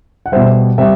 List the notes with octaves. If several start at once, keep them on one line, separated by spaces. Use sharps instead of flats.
F#5
B2 G3 C5 E5
C3 G3 C5 E5